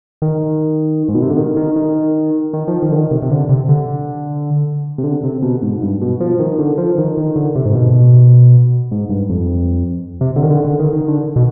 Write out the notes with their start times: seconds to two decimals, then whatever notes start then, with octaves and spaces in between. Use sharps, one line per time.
0.22 D#3
1.09 G#2
1.15 B2
1.22 C3
1.30 D3
1.37 D#3
1.57 D#3
1.76 D#3
2.53 D#3
2.68 F3
2.82 D#3
2.91 D3
2.96 D#3
3.11 C3
3.22 C3
3.31 D3
3.49 C3
3.69 D3
4.98 C3
5.04 D3
5.24 C3
5.42 B2
5.63 G#2
5.82 G2
6.02 B2
6.20 F3
6.39 D#3
6.59 D3
6.78 F3
6.98 D#3
7.17 D#3
7.36 D3
7.56 C3
7.66 G#2
7.75 B2
8.91 G#2
9.09 G2
9.29 F2
10.21 C3
10.36 D3
10.43 D#3
10.50 D3
10.64 D3
10.79 D#3
10.93 D#3
11.08 D3
11.36 B2